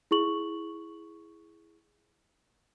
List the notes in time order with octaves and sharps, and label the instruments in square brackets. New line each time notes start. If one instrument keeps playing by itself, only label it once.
[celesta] E4 G#4 C#6 F#7